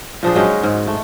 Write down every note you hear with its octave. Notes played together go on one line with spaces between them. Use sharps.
A#2 F3 D4 G#4
F#3 G#3 C#4 D#4
G#2
A3